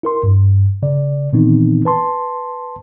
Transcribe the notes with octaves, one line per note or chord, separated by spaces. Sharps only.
E4 A#4 C6
G2
C#3 D5
A#2 D#3 E3 B3 C4 D#4
B4 A5 C6